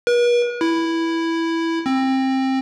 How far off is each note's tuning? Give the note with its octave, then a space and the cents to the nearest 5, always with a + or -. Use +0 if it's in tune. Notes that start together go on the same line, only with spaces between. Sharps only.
B4 -45
E4 +0
C4 +20